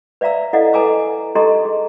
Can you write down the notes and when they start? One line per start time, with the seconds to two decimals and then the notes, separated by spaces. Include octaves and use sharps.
0.21 B4 D5 E5 F5 A#5 E6
0.53 E4 A4 D5 D#5 F5 F#5
0.73 A4 B4 G#5 A#5 D6 E6
1.35 D#4 G4 A4 D#5 A#5 C6
1.65 G#4